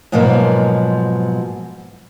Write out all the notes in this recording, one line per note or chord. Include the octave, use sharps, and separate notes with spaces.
G#2 B2 F3 F#3 A#3